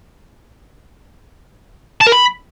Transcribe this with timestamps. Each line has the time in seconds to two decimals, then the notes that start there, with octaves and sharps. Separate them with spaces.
2.01 A5
2.07 A#4
2.12 B5